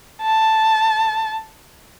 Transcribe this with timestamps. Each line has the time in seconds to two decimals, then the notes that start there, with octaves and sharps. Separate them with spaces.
0.22 A5